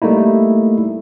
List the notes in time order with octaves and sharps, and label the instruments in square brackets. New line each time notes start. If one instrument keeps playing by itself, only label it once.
[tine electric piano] G3 A3 A#3 D#4 E4